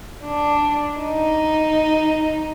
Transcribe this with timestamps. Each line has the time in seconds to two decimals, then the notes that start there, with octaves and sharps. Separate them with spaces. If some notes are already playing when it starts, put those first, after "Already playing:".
0.25 D4
1.02 D#4